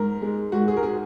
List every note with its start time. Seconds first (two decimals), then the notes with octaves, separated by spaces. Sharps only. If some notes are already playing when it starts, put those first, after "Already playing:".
Already playing: G#2 A#4
0.22 G#3
0.52 G#2 F#4
0.68 G#4
0.77 A#4
0.83 G#3 G#4